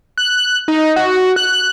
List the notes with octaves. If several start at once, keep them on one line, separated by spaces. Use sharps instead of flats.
F#6
D#4
F#4
F#6